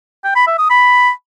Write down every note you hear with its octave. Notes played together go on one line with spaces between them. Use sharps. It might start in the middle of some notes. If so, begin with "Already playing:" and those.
G5
B5
E5
D#6
B5